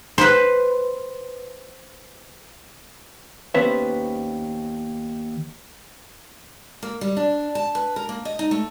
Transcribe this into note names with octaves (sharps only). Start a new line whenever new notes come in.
B4 C5
D#2 B3 C#4 B4 C5 E5
A#3
G3
D4
A5
B4
A#4
A#3
D#5
D#4
A3